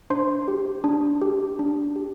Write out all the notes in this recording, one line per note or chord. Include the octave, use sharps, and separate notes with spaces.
D4 C5 C6
G4
D4
G4
D4
G4